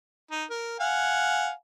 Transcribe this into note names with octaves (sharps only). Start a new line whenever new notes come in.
D#4
A#4
F5 F#5 G#5